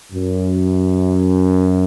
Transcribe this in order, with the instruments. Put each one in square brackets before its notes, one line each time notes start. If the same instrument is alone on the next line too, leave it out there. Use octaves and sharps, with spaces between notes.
[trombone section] F#2